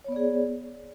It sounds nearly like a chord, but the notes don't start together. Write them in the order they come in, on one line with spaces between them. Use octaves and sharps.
C#5 B3 D5 G#4